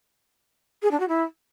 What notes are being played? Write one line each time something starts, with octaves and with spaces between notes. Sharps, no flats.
G#4
D4
F#4
E4